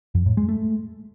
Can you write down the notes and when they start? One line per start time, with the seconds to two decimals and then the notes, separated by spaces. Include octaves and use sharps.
0.15 F2
0.26 A2
0.37 G#3
0.49 A3